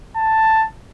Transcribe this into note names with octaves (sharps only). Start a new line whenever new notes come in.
A5